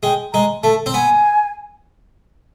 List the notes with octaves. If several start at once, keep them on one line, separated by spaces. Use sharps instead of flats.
G#3 G5
G#3 A#5
A3 A5
C4
B3 G#5